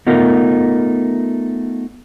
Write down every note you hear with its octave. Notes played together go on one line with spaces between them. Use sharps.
A3 B3 D#4 F4 A#4